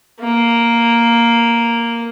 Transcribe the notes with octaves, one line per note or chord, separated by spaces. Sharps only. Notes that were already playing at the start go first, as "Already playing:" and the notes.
A#3